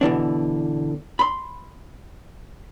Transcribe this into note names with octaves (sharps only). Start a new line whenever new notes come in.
B2 D3 E3 D4
B5 C6